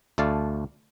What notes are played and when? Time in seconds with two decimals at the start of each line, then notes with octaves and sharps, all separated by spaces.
0.18 D2 A3 D5 F5 A5